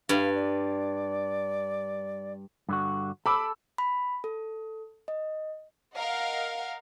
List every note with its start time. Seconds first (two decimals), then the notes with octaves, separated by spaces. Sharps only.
0.09 G2 F5
0.34 D5
2.69 G2 D3 F#4
3.26 A4 B5 D6 E6
3.78 B5
4.24 A4
5.08 D#5
5.96 A#4 D#5 F5 F#5